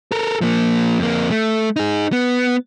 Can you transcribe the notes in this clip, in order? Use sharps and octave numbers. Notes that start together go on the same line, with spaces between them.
A4 A#4
F3 A#3
F2 A#3
A3
D#4 G#4
B3